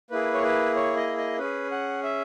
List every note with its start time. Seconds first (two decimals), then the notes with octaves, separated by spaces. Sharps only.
0.11 A#3 E4 G#4 B4
0.34 C#5
0.43 B4
0.75 C#5
0.96 D#5
1.18 D#5
1.39 C#4 G#4 B4
1.71 F#5
2.03 E5